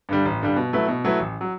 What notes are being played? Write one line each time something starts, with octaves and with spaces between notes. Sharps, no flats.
G2 D3 G3
A1
G2 D3 G3
B2
F#3 A3 E4 B4
B2
F#3 A3 E4 B4
A1
F#3